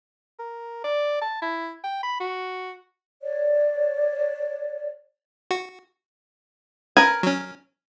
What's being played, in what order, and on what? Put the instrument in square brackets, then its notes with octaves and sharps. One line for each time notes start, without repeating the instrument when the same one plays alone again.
[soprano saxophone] A#4
D5
A5
E4
G5
B5
F#4
[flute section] C#5 D5
[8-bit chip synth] F#4
[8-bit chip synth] C#4 B4 [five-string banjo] A#4 G#5
[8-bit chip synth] F#3 C#4